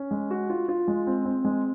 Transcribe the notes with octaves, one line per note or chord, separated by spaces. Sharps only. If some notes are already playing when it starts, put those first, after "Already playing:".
Already playing: C#4
G#3
F#4
F4
F4
G#3
C4
C4
G#3